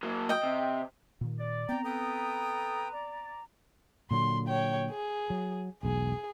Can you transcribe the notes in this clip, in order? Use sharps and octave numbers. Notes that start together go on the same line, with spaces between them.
F#3 A#3
D#5 G5
C3
A#2 D#3
D5
B3 C4 G5 A#5
A4 B4 G5 D#6
D5
A#2 D3 F#3 C6
C#5 G5
G#4
F#3
E1 B1 G#4